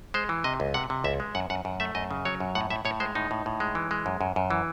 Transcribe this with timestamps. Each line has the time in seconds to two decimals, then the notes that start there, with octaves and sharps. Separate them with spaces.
0.14 G#3 C5
0.29 E3
0.44 C3 D#5
0.60 C#2
0.74 C3 F#5
0.90 C3
1.04 C#2 E5
1.20 G#3
1.35 F#2 F#5
1.50 F#2 F#5
1.65 F#2
1.80 A3 E5
1.95 F#2 D#5
2.11 C#3
2.25 F#3 C#5
2.40 F#2
2.55 A2 F#5
2.70 A2 E5
2.85 A2 C#5
3.00 G#3 C5
3.15 A2 D#4
3.31 A2
3.46 A2
3.60 G#3
3.75 E3
3.91 G#3
4.06 F#2
4.21 F#2
4.36 F#2
4.51 E3